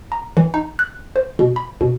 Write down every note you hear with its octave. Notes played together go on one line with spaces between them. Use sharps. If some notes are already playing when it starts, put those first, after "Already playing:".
A#5
E3
D#4
F#6
C5
B2
B5
B2